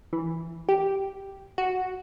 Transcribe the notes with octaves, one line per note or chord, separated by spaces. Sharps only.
E3
G4
F#4